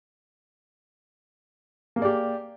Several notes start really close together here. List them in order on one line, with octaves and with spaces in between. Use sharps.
A#3 G#4 D5 G4